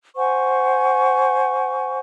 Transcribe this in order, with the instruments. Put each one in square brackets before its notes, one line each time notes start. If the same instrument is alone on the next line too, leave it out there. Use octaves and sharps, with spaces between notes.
[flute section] C5 F#5 G#5 C#6